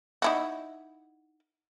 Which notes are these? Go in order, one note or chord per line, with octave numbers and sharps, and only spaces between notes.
D#4 E4 F#4